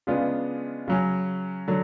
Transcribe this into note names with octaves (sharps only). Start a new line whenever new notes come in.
C#3 G#3 B3 D4 F4
C#3 F#3 C#4
D3 F#3